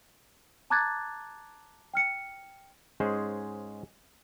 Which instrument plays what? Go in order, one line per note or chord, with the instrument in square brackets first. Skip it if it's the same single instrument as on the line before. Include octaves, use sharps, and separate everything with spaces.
[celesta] A5 A#5 D6 F#6 G#6 A6
G5 F6 C#7
[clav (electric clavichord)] G#2 G#3 C#4 G#4 C5